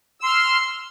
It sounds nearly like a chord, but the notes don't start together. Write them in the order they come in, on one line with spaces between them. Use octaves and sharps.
E6 C6 F6